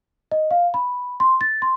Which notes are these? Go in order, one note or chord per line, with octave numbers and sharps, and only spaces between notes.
D#5
F5
B5
C6
A6
C6